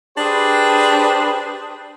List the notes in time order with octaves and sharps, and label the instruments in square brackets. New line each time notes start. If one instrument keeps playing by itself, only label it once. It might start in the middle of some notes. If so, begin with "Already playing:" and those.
[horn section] D4 G4 G#4 B4 C5